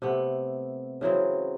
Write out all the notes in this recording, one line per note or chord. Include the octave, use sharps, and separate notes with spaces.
C3 A3 B3
C#3 E3 F#3 C4